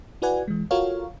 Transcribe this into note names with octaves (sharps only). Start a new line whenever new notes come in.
E4 F#4 B4 D5 F#5 G#5
E3 G#3
F4 F#4 A4 A#4 C#5 F5